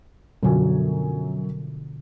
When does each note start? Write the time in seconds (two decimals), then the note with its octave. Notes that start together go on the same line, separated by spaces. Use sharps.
0.43 F#2 B2 D3 F3 F#3 G#5